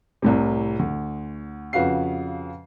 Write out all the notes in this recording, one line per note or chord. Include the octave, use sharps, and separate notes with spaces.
C2 A2 C3
D2
F2 C#3 F#4 B4 F5 C7